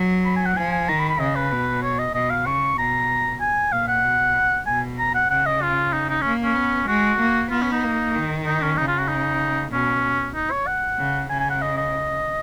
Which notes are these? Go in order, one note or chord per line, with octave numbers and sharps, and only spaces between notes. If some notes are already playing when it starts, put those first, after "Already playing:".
Already playing: F#3
B5
G#5
F#5
F3 G#5
G#5
D#3 A#5
B5
B5
C#3 D#5
B4
B2
C#5
D#5
B2 D#5
F5
C#3 C#6
B2 A#5
G#5
A#2 F5
F#5
B2
B2 G#5
A#5
F#5
C#3 F#5
D#5
F4
D#4
D#4
A#3 C#4
C#4
B3
G#3 F#4
A#3
B3 F4
C#4
D#4
A#3
D#3
D#4
C#4
C#3 D#4
F4
F#4
D#4
B2 C#4
D#4
C#5
F#5
C#3
C#3 G#5
G#5
F#5
D#5
D#5